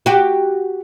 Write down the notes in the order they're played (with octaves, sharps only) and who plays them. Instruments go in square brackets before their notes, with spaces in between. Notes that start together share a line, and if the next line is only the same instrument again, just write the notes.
[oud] F#4 G4